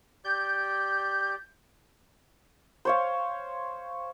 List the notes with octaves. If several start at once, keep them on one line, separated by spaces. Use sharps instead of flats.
G4 D5 G6
C5 C#5 F5